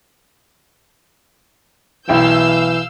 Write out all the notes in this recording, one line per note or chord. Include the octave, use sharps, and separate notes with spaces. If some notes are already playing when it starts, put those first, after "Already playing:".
B1 E3 E4 F5 G5 E6 G6